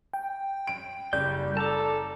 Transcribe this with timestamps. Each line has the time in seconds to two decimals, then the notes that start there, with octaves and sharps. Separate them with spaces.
0.13 G5
0.67 D7
1.13 F#1 G3 D5 G6
1.57 A4 A5 A#5 D6